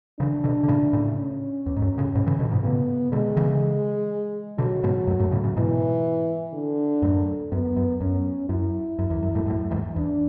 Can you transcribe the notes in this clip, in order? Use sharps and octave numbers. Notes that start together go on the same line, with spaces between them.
C#3 E3 D4
B2 D3
D3
A2 C#3
A2 C#3
C#4
E2
G#2
F#2
A2 C#3
G#2 B2
C#3 E3
B2 D3
G#2 B2
A2 C#3 B3
B2 D3 G#3
C#3 E3
B2 D3 F#3
G#2 B2
F#2 A2
F#2 A2
A2 C#3
A2 C#3
G#2 B2 E3
D3
F#2 A2
F#2 B3
F#2
F#2 C#4
F#2 E4
F#2
E2
F#2
F#2 A2
F#2 A2
E2 G#2
E2 D4